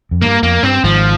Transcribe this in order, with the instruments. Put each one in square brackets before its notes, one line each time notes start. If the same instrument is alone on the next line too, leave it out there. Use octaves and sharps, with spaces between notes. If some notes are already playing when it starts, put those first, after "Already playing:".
[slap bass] F2
[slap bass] G2 [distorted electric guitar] A#3
[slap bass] F2 [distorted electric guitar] A#3
[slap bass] G2 [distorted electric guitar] C4
[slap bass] G#1 G#2 [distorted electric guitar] F3